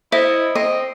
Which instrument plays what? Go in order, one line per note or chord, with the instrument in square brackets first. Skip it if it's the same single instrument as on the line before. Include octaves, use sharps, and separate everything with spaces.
[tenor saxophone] E4 [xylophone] C5 E5 [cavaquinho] D#5
[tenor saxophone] C4 [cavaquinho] D#5